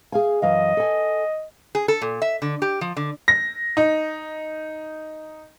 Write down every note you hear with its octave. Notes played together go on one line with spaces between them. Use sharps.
G#4 F5 G#5
F#2 E3 D#5 F5
A4 G#5
G#4
A4
A#2
E5
D3
G4
F3
D3
A#6
D#4